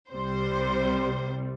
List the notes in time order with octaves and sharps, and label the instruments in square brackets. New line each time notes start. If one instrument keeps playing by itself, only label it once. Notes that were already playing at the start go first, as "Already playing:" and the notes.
[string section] C2 C3 G3 C5